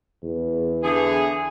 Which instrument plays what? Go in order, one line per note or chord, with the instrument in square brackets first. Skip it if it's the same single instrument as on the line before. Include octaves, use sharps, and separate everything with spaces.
[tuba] E2
[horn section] D3 E3 G#4